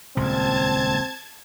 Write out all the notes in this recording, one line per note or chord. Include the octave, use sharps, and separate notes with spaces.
D#1 C#2 C4 A5 G#6